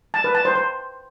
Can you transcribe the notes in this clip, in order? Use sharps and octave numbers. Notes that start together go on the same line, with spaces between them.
A5
B4
A5
C5
C5